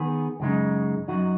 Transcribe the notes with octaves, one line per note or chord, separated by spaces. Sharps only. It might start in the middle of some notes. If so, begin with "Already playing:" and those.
Already playing: D#3 B3 G#4
F#2 C#3 G#3 D#4
F#2 F#3 D#4 F#4